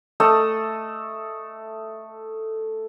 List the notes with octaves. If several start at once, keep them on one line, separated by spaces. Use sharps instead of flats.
A3 A4 D#5